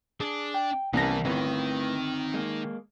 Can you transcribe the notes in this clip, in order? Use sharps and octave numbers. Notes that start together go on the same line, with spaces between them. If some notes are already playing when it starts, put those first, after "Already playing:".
D4 G#4
G5
C2 E3 B3 C#4 A#4 A5 A#6
G1 D#3 A3 C4 E4 B4
G#3 A#3